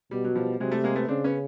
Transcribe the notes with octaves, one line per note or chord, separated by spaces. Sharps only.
B2 G3
F#3
F3 G3
C3 F#3 G#3
G3 A3
G#3 A#3
A3 B3
C#3 C4 D4
B3 C#4